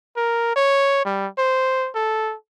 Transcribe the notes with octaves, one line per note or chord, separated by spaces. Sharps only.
A#4
C#5
G3
C5
A4